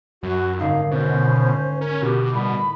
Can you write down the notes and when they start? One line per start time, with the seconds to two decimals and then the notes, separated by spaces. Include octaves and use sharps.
0.23 F#2 F#4
0.59 G#1 G#2 D3 D#4 F5
0.91 B2 C#4 C5
1.81 C#4 A#4
2.02 B2 G4
2.33 A2 G3 B5